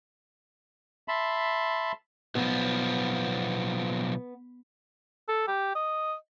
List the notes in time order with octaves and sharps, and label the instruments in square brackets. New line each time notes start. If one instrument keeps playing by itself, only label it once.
[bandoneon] E5 A5 B5 C6
[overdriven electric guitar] B1 F3 [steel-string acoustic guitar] B3
[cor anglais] A4
G4
D#5